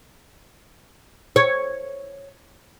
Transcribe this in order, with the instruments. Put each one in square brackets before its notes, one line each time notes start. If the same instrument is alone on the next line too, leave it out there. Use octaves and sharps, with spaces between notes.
[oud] C#5